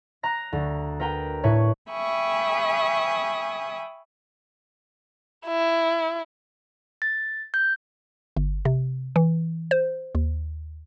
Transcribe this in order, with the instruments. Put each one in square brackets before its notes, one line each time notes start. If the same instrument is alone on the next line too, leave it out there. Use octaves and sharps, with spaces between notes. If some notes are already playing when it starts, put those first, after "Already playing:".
[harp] A#5 F#6 A#6
D2
A#4 B4 G5 A#5
A2 B4 C#5
[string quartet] E5 G5 G#5 B5 C#6 D#6
[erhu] E4
[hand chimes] A6
G6
[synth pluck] G1
C3
E3
C5
D#2